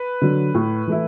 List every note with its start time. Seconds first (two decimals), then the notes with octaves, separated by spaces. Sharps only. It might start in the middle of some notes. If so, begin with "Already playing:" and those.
Already playing: B4
0.22 D3 F#3
0.54 A2
0.87 E3 A3 E4